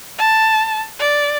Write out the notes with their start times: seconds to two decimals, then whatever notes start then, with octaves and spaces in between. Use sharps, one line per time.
0.18 A5
0.99 D5